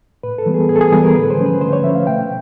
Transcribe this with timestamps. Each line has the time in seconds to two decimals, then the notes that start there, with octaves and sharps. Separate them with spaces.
0.23 A2 B4
0.38 A4
0.46 E3 G3 B3
0.54 G#4
0.69 A2 G#4
0.76 A4
0.81 G#4
0.92 E3 G3 B3 G#4
1.03 A#4
1.15 D3 B4
1.30 C5
1.38 F3 A3 C#4
1.46 B4
1.61 D3 C5
1.73 C#5
1.84 F3 A3 C#4 E5
1.95 F5
2.07 B2 G5